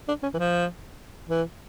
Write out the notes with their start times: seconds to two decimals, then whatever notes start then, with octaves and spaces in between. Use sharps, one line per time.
0.08 D4
0.23 C#4
0.34 E3
0.38 F3
1.29 E3